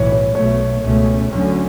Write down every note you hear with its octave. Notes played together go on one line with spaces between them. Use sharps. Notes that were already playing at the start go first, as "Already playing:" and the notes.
Already playing: B1 A2 E3 C#5
C#5
B1 B2 A3 C#5
C#2 B2 A3 C#4
D2 D3 F#3 C#4